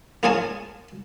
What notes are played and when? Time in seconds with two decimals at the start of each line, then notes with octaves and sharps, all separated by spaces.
0.23 A#3 F4 G#4 C#5 G#5 A5